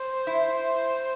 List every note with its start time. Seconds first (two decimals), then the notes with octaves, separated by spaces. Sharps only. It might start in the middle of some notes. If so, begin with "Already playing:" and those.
Already playing: C5
0.27 E4